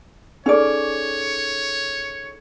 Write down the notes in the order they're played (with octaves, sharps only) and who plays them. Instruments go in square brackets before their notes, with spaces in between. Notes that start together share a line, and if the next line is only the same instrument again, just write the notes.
[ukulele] C#4 D5 [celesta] D#4 G#4 A4 [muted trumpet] C#5